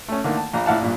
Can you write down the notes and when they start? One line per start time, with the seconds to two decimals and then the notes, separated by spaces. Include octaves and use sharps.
0.08 A3 C#4
0.24 D3 D#3 A3 A#3
0.37 A5
0.53 A#1 A#5
0.66 A#1 A2 E4 F5 F#5 A5
0.81 A#1 G2 A#2